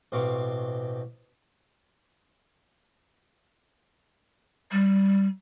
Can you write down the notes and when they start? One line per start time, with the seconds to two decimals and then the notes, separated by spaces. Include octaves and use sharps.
0.12 A1 B2 C4 F5 C#6 D6
4.72 G3